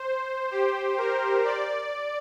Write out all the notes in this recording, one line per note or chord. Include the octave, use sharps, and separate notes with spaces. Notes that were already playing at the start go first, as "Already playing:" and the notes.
Already playing: C5
G4
A#4
D5